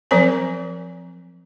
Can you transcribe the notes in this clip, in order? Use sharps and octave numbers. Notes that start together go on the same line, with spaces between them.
F3 F#3 C4 A#4 C5 G#5